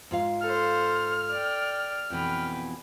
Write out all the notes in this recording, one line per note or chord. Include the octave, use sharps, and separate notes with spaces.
G#2 F4 F5
A4 C5 F6
D5 G5
F2 B2 E3 B4 G5